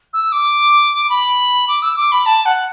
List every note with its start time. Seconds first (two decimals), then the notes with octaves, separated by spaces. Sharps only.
0.13 E6
0.32 D6
1.09 B5
1.68 D6
1.82 E6
1.96 D6
2.11 B5
2.26 A5
2.45 F#5